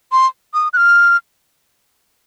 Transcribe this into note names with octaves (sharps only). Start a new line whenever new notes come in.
C6
D#6
F#6
F6